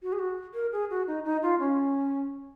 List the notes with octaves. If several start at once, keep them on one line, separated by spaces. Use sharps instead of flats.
F#4
G#4
F#4
A#4
G#4
F#4
D#4
D#4
F4
C#4